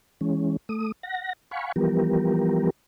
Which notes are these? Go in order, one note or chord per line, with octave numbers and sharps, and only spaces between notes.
E3 G#3 C#4
A3 D#6
F#5 A#6
F5 F#5 G#5 B5 C#6
E3 F3 G3 B3 G4 A#4